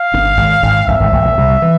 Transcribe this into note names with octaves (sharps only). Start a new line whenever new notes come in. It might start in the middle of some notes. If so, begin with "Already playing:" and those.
Already playing: F5
G1 G2
G#1 G#2
G#1 G#2
G1 G2 E5
G#1 G#2
G#1 G#2
A#1 A#2
C2 C3
E3